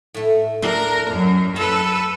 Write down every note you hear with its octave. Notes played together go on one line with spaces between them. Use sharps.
A2 A3
D4 A#4
F#2
A4 B4 A#5